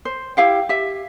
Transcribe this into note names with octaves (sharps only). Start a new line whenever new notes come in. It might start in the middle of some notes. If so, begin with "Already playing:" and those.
C5
E4 G4 F5 G5
G4 E5